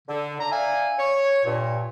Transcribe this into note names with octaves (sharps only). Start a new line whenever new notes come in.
D3
D4 A#5
D5 E5 F5 G#5
C#5
G2 A#2